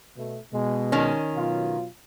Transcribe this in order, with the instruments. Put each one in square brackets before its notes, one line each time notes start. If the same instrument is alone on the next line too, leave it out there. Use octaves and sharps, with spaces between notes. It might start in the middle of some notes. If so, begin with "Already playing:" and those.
[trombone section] B2 A3
B2 G#3
[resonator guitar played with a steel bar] D#3 C#4
[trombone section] B2 F#3 F4